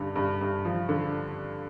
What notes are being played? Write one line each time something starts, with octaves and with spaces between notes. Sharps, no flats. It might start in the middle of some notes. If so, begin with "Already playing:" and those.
Already playing: G2 D3
G2
G2
F3
D3